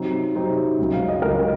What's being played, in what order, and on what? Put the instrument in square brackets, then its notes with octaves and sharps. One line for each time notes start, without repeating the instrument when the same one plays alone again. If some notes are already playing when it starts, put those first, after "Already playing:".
Already playing: [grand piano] C3 F#3 C4 D#4
C3 F#3 C4 D#4
C#2 C#3 F#3
[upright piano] F5
D#5
[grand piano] C#2 C#3 F#3 [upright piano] A#4